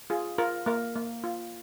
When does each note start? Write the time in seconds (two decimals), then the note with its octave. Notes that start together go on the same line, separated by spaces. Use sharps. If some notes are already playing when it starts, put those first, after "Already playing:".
0.10 F4 G#4
0.38 F4 A#4
0.66 A#3 A#4
0.96 A#3
1.24 F4